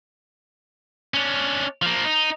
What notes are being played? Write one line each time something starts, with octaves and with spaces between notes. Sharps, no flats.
C#4 D4
F3 A#3
D#4